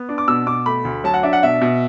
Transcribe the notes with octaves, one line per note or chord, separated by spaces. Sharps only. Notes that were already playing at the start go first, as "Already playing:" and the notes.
Already playing: B3
D4
D6
B2 E6
B2 D6
A3 B5
D2
F#3 A5
F#5
D4 E5
F#5
B2 E5
B2